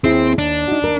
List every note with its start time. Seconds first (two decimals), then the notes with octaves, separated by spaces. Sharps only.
0.04 D#2 C4 E4 G#4
0.38 D#2 D4
0.68 D#4 F#4
0.82 D#2 A#4